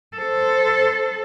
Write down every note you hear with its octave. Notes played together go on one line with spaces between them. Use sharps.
A4 C5